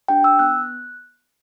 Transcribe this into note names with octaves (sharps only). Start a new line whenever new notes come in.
D4 G4 G5
E6
B3 F#6